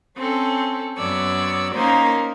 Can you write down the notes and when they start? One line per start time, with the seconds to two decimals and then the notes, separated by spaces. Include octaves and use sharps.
0.16 C4 C#4 A4
0.98 F#2 B3 C#5 D5 E6
1.75 A#3 C#4 D#4 A#4 C5